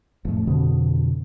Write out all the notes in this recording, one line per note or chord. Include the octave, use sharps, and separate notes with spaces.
F1 A2
F2 B2 D3